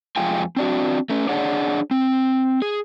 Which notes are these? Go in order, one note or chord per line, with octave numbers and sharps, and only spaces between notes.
F2 G#3 F4 F5 G5 G#5
C4 D4 F#4
A3 C#4
D4 G#4 C#5 D5 F#5
C4
G#4